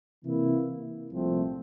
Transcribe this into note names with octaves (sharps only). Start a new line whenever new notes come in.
C3 E3 A#3 E4
C2 A#2 F3 A3 C4